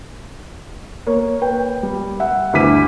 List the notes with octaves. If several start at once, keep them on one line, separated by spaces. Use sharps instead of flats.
A#3 C#5
B4 G5
G3
E5 F#5
D2 G2 E4 D6 B6 D#7